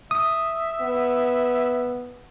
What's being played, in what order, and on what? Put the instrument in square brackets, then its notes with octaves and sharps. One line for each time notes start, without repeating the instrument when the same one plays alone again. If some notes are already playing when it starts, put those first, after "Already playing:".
[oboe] E5 [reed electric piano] D#6
[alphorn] B3